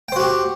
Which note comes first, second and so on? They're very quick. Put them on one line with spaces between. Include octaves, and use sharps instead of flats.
G5 C5 F#4 G4